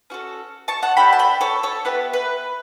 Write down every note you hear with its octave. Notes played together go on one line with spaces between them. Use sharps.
C#4 F#4 A4
A5 C#6
F#5 A5
D4 F#4 A4 G5 B5
A5
G5 B5
A4 C#5
A4 C#5
B3 E4 G4 B4
B4